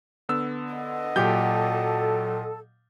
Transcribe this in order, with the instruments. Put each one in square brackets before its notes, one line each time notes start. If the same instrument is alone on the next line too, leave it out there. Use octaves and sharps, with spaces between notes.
[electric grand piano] D3 B3 E6
[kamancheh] D#5 F#5
[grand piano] A#2 G4 G6 [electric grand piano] F#3 [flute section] A4